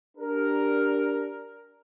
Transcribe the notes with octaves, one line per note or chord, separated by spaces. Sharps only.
D4 G4 A#4